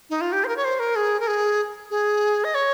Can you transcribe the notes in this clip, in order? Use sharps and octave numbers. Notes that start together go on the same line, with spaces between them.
D#4
F4
G4
C5
A#4
C#5
C5
A#4
G#4
A#4
G#4
G#4
D#5
C#5